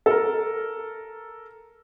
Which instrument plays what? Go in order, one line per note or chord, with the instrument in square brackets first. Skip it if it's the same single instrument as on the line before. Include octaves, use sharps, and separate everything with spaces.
[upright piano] A4 A#4